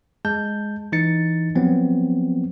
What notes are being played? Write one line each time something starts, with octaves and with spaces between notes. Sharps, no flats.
G#3 A5 G6
E3 D#4 A6 C#7
F3 F#3 B3 C4